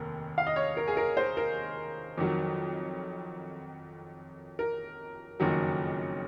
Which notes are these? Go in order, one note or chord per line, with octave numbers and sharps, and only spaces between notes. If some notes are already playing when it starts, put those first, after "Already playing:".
Already playing: F1 D#2 A#4
F5
D#5
C#5
A#4
G#4
A#4
C5
A#4
F2 D#3 F#3
A#4
F#1 F2 D#3 F#3